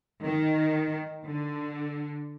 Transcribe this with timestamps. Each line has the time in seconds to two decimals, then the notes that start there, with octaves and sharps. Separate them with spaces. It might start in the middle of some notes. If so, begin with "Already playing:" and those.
0.22 D#3
1.25 D3